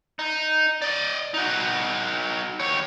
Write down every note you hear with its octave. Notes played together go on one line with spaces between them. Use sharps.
D#4
D5 D#5
D#4 F#4
D#2 C#5